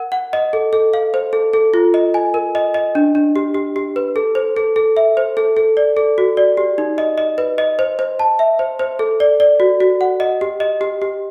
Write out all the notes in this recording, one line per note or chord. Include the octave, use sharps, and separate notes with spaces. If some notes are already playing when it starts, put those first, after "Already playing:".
Already playing: A#4 F#5
F#5
D#5
A4
A4
F5
C5
A4
A4
F4
D#5
G#5
A#4
D#5
D#5
D4
D4
G4
G4
G4
B4
A4
C5
A4
A4
E5
C5
A4
A4
D5
A4
F#4
D5
G4
D#4
D#5
D#5
B4
D#5
C5
C5
A5
E5
C5
C5
A4
D5
D5
F#4
F#4
F#5
D#5
G4
D#5
G4
G4